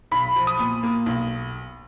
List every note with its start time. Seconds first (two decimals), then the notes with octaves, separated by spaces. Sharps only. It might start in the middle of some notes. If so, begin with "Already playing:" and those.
0.12 B1 B5
0.36 F3
0.47 D#6
0.59 A#2
0.83 A#3
1.06 B1